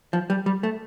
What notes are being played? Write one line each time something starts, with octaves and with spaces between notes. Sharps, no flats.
F3
G3
G3
A3